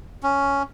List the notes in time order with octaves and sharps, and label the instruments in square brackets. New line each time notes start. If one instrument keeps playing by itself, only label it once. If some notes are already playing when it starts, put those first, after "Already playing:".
[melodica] C#4